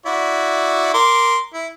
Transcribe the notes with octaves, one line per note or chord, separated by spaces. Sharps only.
E4 F#4 D5
A#4 C6 D6
E4